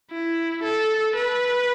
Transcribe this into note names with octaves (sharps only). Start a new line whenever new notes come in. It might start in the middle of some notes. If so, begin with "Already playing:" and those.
E4
A4
B4